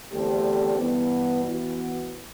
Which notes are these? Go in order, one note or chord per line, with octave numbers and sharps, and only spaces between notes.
E2 D3 A3 C4 G4
G2 E3 B3
E3 B3 F#4